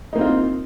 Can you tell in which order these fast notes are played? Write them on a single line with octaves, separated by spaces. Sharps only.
D#4 A#3 C4 F4